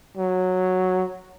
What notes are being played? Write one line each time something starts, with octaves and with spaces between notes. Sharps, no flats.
F#3